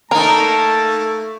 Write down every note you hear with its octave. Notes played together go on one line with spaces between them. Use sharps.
A3 A#3 D#4 A#4 A5 A#5